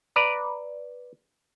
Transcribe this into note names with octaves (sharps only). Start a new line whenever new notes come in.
B4 D5 A#5